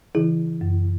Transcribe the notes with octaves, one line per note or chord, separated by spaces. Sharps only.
C#3 E3 E4 G#4
F#2